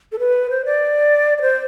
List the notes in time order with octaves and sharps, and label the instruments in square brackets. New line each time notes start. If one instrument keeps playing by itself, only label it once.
[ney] A4
B4
C5
D5
D5
C5